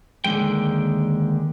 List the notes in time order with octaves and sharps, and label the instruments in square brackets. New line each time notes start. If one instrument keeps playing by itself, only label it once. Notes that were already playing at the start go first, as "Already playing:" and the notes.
[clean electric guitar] D#2 D3 E3 G#3 G5